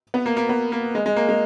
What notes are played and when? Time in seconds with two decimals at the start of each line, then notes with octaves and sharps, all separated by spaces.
0.14 B3
0.26 A#3
0.37 A#3
0.49 B3
0.72 A#3
0.95 G#3
1.06 G#3
1.16 A#3
1.29 G#3